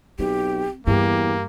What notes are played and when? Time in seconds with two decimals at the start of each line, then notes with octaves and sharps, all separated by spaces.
0.19 B1 C4 G4
0.87 E2 G2 A#3 G4